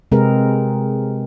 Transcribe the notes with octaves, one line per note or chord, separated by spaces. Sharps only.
C3 G#3 C4 G#4 A#4 B4